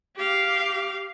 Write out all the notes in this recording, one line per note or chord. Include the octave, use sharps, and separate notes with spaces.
G4 F5